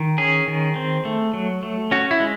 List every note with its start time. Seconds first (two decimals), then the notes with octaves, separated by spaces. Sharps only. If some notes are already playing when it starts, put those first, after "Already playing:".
Already playing: D#3
0.18 C#4 G#4
0.48 D#3
0.76 C4
1.05 A3
1.34 F#3
1.63 A3
1.91 C#4 F#4
2.11 E4
2.20 G#3